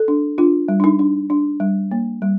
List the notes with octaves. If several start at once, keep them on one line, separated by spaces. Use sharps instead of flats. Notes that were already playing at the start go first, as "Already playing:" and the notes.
Already playing: A4
D4
D4 F4
G3
D4
D#4
D4
D4
G3
A#3
G3